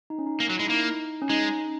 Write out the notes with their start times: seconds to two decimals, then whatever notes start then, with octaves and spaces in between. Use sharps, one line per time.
0.10 D#4
0.19 C#4
0.27 D#4
0.40 A#3
0.50 F#3
0.59 G#3 E4
0.69 A#3 D#4
1.22 C#4
1.29 G#3 D#4